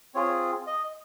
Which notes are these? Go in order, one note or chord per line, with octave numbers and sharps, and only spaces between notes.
C4 F4 G#4 C#5
D#5